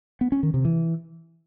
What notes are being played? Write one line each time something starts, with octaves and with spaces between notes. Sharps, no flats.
B3
C#4
D#3
C3
E3